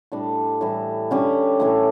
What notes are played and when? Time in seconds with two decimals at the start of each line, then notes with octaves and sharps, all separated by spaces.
0.12 A2 G3 D4
0.61 A2 E3 G3
1.11 D3 G3 C#4 G4
1.60 A2 E3 A3